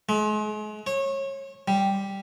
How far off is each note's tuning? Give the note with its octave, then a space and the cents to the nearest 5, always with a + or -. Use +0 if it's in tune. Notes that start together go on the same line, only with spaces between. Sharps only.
G#3 +40
C#5 -25
G3 +0